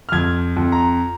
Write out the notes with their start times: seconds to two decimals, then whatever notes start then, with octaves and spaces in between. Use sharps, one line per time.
0.09 F6
0.12 F2 G#6
0.57 F2
0.72 A#5